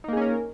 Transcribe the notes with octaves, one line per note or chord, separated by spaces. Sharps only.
A#3 C#4 D#4 G#4 A#4